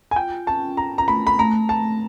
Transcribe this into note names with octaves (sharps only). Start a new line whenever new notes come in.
G#5
F4 G5
C#4 A5
C#4 A#5
A#5
A3 B5
B5
A3 A#5
A3 A5